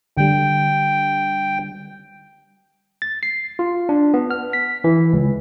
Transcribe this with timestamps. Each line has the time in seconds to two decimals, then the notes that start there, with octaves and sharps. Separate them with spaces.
0.17 D3 G3 G5
3.02 A6
3.23 C7
3.59 F4
3.89 D4
4.14 B3
4.31 F6
4.53 B6
4.84 E3
5.13 C#2